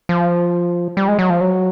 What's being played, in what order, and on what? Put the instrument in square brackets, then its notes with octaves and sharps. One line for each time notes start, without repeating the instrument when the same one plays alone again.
[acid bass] F3
G3
G#3
F#3
F3
F#3